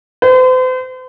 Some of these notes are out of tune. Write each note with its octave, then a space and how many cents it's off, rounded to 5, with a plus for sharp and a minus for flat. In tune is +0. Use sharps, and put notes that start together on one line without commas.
C5 -40